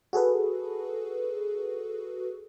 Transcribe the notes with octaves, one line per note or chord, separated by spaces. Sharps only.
F#4 G#4 A4 B4